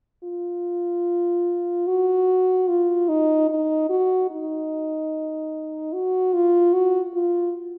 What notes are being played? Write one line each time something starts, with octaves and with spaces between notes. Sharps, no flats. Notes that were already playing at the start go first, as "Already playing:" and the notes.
F4
F#4
F4
D#4
D#4
F#4
D#4
F#4
F4
F#4
F4